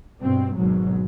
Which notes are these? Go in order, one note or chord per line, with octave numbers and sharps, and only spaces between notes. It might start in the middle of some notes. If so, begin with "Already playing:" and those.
G2 B2 C4
G#1 G#2 B2 F#3